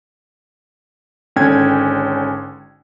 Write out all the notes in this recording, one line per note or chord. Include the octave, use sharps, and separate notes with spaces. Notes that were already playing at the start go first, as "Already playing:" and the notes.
G#1 D3 C#4 G5 G#6